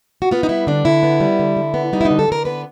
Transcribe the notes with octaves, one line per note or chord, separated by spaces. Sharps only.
F#4
B3 F4
D#4
G3 E4
D3 D4
D3 E4
B3
G3
D3
D3
B3
G3 D#4
E4
D#4
D3
A4
D3 A#4
B3 B4